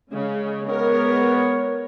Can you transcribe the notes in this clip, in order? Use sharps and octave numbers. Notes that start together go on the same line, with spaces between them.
C#3 G#3
B3 A#4 C#5